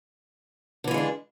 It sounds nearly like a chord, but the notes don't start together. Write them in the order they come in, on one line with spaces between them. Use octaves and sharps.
D3 E3 F4 G#3 D4